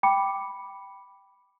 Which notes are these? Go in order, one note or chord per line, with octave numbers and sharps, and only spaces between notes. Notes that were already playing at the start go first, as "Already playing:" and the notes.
G5 B5 D6 C#7